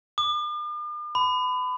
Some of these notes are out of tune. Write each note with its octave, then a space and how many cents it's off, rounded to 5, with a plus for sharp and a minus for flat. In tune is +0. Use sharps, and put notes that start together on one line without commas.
D6 +45
B5 +30